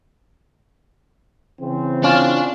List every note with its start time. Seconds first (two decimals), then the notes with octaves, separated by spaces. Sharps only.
1.61 C#3 E3 C4
2.04 C#4 D4 F4